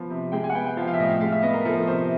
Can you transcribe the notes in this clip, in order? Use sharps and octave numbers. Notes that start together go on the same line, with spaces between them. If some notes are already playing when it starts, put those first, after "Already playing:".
Already playing: F3 B3
C3
G#3 G5
G#5
F#5
B3 G5
G5
F3 F5
F5
E5
A2 D#5
F5
G#3 F5
E5
B3 D#5
A#4
F3 A4
C3 C5